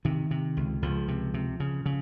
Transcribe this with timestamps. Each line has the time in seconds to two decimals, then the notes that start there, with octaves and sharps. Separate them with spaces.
0.05 C3 D#3
0.31 C3
0.57 C#2
0.82 C#2 F3
1.08 C3
1.34 C3
1.60 C#3
1.86 C#3